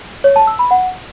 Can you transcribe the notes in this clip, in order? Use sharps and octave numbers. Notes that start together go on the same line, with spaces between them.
C#5
A5
E6
B5
F#5